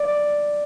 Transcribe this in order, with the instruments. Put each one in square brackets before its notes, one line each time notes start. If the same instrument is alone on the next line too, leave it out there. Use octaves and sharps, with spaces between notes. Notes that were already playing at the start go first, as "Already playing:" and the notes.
Already playing: [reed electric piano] D5